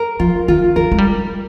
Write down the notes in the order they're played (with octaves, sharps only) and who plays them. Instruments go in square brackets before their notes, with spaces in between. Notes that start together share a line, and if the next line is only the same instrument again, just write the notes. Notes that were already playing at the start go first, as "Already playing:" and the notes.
Already playing: [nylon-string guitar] A#4
[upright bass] F3 [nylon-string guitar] F4
[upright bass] D#3 [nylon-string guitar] F4
[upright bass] D#3 [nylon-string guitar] A#4
[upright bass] G#3
G3